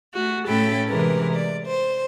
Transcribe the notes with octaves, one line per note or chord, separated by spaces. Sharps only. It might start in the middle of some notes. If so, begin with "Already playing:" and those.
A3 F#4
A2 A3 C#4 A4 G5 B5
C3 E3 G#3 A#4 B4
D5
C5